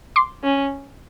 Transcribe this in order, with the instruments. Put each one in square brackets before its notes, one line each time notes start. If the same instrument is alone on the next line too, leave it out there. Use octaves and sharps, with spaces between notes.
[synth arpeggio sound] C6 D6
[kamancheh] C#4